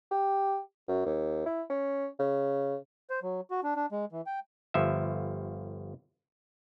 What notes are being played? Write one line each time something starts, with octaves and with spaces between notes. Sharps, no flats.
G4
F#2
D#2
E4
C#4
C#3
C5
F#3
F#4
D4
D4
G#3
E3
G5
G1 F3 E5